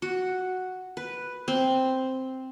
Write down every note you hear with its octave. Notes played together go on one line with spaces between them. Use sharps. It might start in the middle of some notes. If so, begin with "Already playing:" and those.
F#4
B4
C4